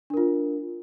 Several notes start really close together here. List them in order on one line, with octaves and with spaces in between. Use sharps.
D4 A#4 F4